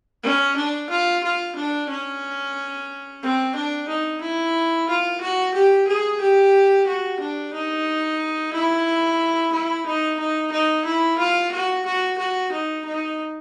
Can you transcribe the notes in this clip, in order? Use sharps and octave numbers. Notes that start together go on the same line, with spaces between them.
C#4
D4
F4
F4
D4
C#4
C4
D4
D#4
E4
F4
F#4
G4
G#4
G4
F#4
D4
D#4
E4
E4
D#4
D#4
D#4
E4
F4
F#4
F#4
F#4
D#4
D#4